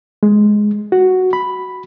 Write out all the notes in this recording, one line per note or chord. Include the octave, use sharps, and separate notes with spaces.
G#3
F#4
B5